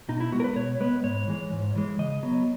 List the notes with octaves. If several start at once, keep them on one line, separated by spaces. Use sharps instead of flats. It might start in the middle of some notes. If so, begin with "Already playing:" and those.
B2 D#4
E4
G#3 B3 F#4
A#4
B4
B2 C#5
G#3 B3 B4
G#2 C#5
E3 G#3
G#2
E3 G#3
C#3 D#5
F#3 B3